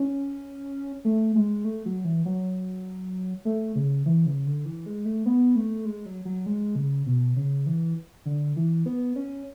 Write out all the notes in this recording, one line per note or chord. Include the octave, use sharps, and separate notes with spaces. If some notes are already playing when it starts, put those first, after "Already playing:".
Already playing: C#4
A3
G#3
A3
F#3
E3
F#3
A3
C#3
E3
C#3
D3
E3
G#3
A3
B3
A3
G#3
F#3
F#3
G#3
C#3
B2
C#3
E3
D3
E3
B3
C#4